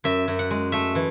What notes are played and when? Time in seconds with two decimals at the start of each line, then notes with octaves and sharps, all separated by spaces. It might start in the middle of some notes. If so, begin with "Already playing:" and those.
0.04 F#2 E5
0.28 F#2
0.39 F#5
0.51 G#3
0.72 A3 E5
0.95 E3